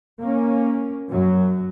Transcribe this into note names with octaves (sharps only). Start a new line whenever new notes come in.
A#3 C#4
F#2 F#3